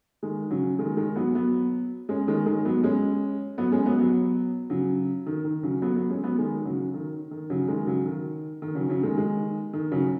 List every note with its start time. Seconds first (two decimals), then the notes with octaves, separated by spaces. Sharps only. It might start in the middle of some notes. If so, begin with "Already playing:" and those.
0.23 D#3 G#3
0.50 C#3 F#3
0.79 D#3 G#3
0.97 D#3 G#3
1.16 F#3 B3
1.35 F#3 B3
2.09 G#3 C#4
2.28 D#3 G#3
2.46 D#3 G#3
2.65 F#3 B3
2.84 G#3 C#4
3.58 F#3 B3
3.72 G#3 C#4
3.86 F#3 B3
4.00 F#3 B3
4.70 C#3 F#3
5.26 D#3
5.45 D#3
5.63 C#3 F#3
5.82 F#3 B3
5.96 F#3 B3
6.10 G#3 C#4
6.24 F#3 B3
6.38 D#3 G#3
6.65 C#3 F#3
6.94 D#3
7.31 D#3
7.50 C#3 F#3
7.68 D#3 G#3
7.87 C#3 F#3
8.06 D#3
8.62 D#3
8.75 C#3 F#3
8.89 C#3 F#3
9.03 D#3 G#3
9.17 D#3 G#3
9.73 D#3
9.92 C#3 F#3